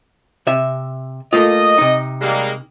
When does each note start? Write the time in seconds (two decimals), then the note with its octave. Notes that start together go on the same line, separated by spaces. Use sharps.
0.47 C3 E5
1.33 A3 A#3 F4 D#5
1.78 C3 D#4
2.21 G3 G#3 A#3